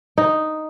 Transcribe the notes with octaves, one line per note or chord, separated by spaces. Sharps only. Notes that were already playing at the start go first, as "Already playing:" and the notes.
D#4